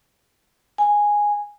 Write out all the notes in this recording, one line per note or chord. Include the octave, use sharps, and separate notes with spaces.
G#5